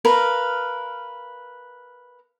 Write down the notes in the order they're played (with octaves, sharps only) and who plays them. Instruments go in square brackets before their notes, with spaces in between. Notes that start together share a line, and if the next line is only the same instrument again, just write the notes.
[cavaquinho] A#4 B4 F5